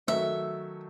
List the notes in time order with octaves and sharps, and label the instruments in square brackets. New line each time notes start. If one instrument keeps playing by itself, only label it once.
[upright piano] D#3 F#3 A3 [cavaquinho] E5